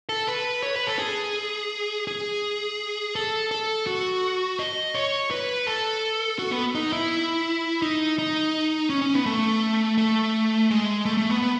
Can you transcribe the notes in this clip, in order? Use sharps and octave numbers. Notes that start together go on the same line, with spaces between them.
A4
B4
C#5
B4
A4
G#4
G#4
A4
A4
F#4
D#5
C#5
B4
A4
F#4
B3
D#4
E4
D#4
D#4
C#4
C#4
B3
A3
A3
G#3
A3
A3
B3
B3